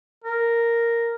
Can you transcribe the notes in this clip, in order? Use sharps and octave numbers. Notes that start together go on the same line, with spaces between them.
A#4